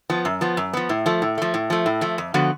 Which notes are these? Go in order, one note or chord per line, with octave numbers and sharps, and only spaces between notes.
F3 B3
F#2
F3 B3
F#2
F3 B3
A2
F3 A3
A2
F3 A3
A2
F3 A3
A2
F3 A3
F2
D3 F3 B3 F#4